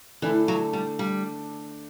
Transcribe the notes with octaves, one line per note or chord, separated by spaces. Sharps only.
D3 E3 A3 D4 A4
F#3
G3
G3